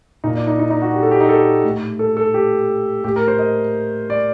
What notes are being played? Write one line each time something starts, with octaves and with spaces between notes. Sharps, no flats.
A#2 D#4
D4
D#4
D#4
D#4
F#4
G4
A4
G4
D#4
A4
A2
A4
A4
G4
A2 G4
A#4
C5
D#5
D5